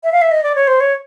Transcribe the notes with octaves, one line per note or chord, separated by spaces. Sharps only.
E5
F5
E5
D#5
D5
C#5
C5
C#5